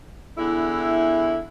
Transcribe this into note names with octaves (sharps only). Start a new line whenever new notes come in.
E2 D3 E4